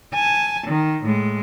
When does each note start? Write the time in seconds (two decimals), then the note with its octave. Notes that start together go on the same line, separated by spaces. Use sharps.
0.13 G#5 A5
0.68 D#3
1.05 A2 G#3